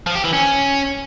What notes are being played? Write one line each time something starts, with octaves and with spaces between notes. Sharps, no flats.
F3
G4
E3
C#4